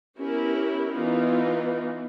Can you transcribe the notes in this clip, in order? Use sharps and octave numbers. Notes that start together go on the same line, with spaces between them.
B3 C#4 E4 G4 A#4
E3 B3 D#4 F4